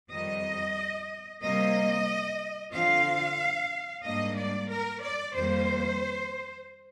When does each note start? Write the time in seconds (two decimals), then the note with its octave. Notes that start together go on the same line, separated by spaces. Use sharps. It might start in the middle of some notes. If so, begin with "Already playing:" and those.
0.10 F2 D#3 G3 D#5
1.42 C3 G3 A#3 D#5
2.72 D3 F3 C4 F4 F5
4.04 G#2 G3 A#3 D4 D#5
4.37 D5
4.70 A#4
5.02 D5
5.35 F2 D#3 G3 A#3 C5